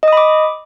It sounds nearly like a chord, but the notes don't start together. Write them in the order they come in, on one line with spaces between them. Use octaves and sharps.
D#5 D#6 B5 D6